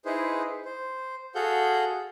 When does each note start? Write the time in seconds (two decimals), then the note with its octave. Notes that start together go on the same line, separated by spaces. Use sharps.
0.05 D#4 E4 G#4 B4 C5
0.65 C5
1.35 F#4 G#4 A4 F5 F#5 G6